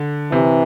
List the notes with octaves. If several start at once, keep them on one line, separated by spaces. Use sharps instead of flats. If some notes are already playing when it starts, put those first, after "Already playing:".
Already playing: D3
C3 E3